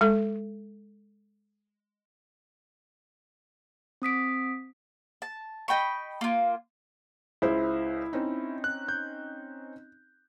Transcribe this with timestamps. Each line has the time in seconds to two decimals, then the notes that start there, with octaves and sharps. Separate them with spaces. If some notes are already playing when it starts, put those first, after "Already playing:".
0.01 G#3 A4
4.02 C4 D#6 B6 D7
5.22 A5
5.68 D#5 G5 B5 C#6
6.21 A#3 F4
7.42 C#2 G#3 E4 C5
8.13 C4 C#4 D#4
8.64 F#6
8.88 G6